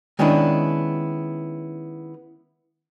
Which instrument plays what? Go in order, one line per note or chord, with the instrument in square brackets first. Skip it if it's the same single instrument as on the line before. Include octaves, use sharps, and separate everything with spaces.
[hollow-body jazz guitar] D#3 G#3 B3 C#4 D4 E4